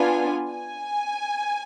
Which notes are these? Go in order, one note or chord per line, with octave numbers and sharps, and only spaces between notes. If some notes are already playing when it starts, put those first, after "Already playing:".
Already playing: B3 D4 F4 G#5
G#5